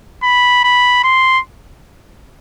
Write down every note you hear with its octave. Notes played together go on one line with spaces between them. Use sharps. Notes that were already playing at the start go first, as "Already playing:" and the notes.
B5
B5
C6